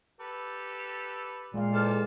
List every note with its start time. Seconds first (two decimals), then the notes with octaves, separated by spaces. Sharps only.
0.20 G4 A4 B4
1.54 A#2 G#3 F5
1.74 E2 A4 C5 A5 D6 F6